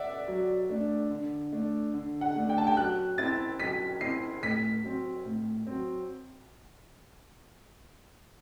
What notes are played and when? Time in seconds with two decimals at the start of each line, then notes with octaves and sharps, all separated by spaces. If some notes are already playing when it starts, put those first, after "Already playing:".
Already playing: D5 E5 F#5
0.28 F#3
0.69 A3 D4
1.11 D3
1.52 A3 D4
1.94 D3
2.21 F#5
2.35 A3 D4
2.49 G5
2.58 A5
2.67 G5
2.77 F#3 F#6
3.18 C4 E4 A6
3.60 F#3 B6
4.01 C4 E4 C7
4.42 A2 B6
4.84 F#3 C4
5.25 A2
5.67 F#3 C4